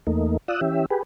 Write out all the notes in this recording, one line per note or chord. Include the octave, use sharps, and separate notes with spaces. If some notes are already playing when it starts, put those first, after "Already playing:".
E2 A3 A#3 D#4
F4 D5 D#6 E6 F#6
E3 C#4 G4 E5
G4 G#4 B4